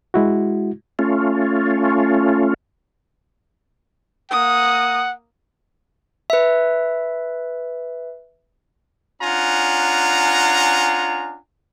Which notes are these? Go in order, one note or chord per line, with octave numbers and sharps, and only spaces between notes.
G#3 E4 F#4
A3 C#4 F4
A#3 F#5 D#6
B4 E5
C#4 D4 F4 F#5 G#5 A#5